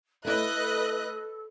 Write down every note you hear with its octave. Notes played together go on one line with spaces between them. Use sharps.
A3 E4 A4 B4 D#5 F#6